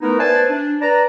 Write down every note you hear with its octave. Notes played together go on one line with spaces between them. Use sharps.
A3 B3 D#4 E4 A#4 B4
B4 C5 D5 E5 G#5 A5
D4
B4 D5 A5 A#5